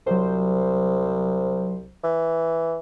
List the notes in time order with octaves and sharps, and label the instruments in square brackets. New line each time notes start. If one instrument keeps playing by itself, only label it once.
[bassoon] C2 [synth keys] F#3 C5
[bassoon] E3